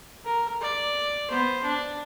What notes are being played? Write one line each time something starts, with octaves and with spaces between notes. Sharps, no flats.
A#4
D5
B3 C5
D4